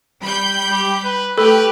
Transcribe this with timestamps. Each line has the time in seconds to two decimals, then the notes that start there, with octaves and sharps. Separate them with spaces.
0.21 G3 B5 G6
0.72 G4
1.04 B4
1.38 A3 G4 A4 B4